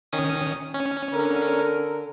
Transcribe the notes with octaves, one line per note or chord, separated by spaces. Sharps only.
D#3 C#4 D#6
C#4
D3 A#4